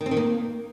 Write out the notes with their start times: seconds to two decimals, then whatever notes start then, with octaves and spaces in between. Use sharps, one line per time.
0.01 D#3
0.06 C4
0.11 D#3
0.17 A#3